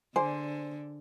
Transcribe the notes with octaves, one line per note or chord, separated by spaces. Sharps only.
D3 G#4 C5 D5 G#5